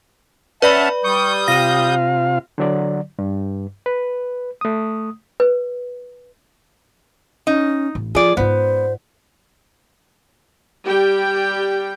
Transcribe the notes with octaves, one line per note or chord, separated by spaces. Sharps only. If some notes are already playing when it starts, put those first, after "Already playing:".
C#4 B4 D5 E5 F#5 A5 B5 F6
G3 C#6 D#6 G6
C3 F4 F5 A#6 D#7
D3 F#3 D5
G2
B4
A3 D#6
B4
C#4 D#4
A1
F3 F4 G#4 D5
G#2 B3 F4 C5
G3 G4 G5